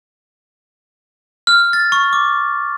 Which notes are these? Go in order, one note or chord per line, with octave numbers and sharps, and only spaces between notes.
F6
A6
C#6
D6